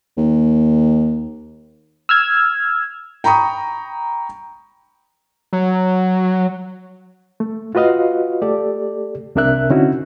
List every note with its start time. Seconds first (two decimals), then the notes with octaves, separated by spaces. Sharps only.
0.17 D#2
2.09 E6 F6 G#6
3.24 G5 A#5 B5 C#6 D#6
5.53 F#3
7.40 A3
7.75 F4 F#4 B4 D#5 F5
8.41 A3 G4 A4 D5
9.35 C2 C3 D4 A#4 E5 F#6
9.70 D3 C4 C#4 D#4 E4 F#4